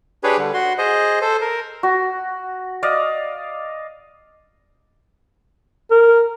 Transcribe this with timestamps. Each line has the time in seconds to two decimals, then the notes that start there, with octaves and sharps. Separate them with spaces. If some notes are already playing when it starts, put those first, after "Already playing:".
0.23 D4 G4 G#4 B4 C#5
0.38 D3 G3
0.54 F#4 C6
0.78 G#4 C5 D#5
1.21 A4 C5
1.41 A#4
1.83 F#4
2.83 D5 D#5 F5
5.91 A#4